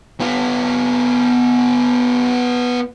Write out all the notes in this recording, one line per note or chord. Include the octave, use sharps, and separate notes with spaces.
B3 F4